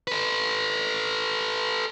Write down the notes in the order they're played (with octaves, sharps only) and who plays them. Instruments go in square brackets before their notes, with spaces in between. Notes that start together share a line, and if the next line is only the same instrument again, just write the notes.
[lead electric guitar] A4 B4